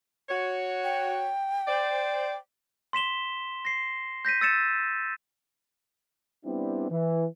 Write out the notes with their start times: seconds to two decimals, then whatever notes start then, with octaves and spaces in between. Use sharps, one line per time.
0.30 F#4 C#5
0.84 G5
1.67 C5 D5
2.93 C6 B6 E7 G7
3.65 A#6 C7
4.25 G6 A#6 B6 D#7
4.41 E6 A6 C#7 E7
6.45 G3 B3 C4 D4 E4
6.90 E3